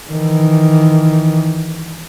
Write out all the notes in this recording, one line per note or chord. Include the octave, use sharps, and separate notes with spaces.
D#3 E3